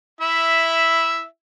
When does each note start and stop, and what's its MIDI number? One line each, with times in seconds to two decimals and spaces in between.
0.21 1.24 64
0.21 1.24 76